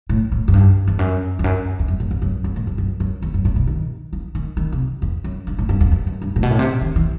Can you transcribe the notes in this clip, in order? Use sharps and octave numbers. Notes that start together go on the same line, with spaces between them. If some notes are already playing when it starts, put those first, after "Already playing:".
A2
A2
F#2
G2
E2
F#2
E2
F#2
E2
F#2
A2
G2
F#2
F#2
A2
G2
F#2
F#2
E2
F#2
A2
B2
D#3
E3
D#3
D#3
C3
E2
F#2
G2
A2
G2
E2
E2
F#2
G2
A2
B2
A2
C3
D#3
E3